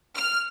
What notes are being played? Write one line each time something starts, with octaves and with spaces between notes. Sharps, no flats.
F6